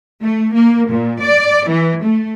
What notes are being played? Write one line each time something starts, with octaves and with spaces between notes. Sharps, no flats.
A3
A#3
A#2
D5
E3
A3